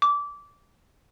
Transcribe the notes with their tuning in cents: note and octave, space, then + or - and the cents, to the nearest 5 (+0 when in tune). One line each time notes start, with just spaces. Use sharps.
D6 -20